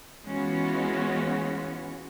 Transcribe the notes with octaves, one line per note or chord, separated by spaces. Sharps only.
E3 G#3 B3 C#4 F4 F#4